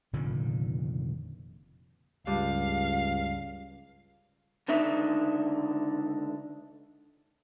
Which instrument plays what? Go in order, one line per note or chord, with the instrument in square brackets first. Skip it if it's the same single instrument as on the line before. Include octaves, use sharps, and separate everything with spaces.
[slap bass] F1 A#2 D3 D#3
[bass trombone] C#2 [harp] G2 [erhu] F5
[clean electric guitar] C#2 D3 D4 D#4 E5